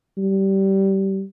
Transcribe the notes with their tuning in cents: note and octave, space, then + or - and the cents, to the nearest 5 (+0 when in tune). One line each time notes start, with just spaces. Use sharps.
G3 -20